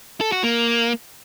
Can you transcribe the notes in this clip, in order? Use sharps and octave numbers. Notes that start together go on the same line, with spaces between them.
A4
F#4
A#3